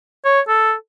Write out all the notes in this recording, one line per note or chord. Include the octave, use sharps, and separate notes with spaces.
C#5
A4